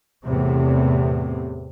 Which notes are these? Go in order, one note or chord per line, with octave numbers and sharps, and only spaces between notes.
E2 A2 C3